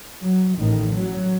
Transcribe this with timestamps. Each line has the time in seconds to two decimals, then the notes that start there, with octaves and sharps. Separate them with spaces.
0.22 F#3
0.58 A1 A2 D#3
0.95 F#3